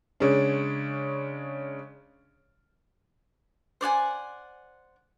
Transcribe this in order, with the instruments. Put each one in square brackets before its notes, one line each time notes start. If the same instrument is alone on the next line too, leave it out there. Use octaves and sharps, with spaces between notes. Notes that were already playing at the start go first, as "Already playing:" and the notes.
[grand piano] C#3 G#3 C#4 D4
[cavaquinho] C5 D5 F#5 G#5